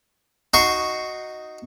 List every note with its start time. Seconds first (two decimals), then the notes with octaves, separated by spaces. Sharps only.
0.54 D#4 F#4 C6 C#6